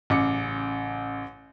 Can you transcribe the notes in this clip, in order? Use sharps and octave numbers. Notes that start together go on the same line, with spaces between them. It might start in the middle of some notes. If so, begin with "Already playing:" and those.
A1 C#3 D6 C#7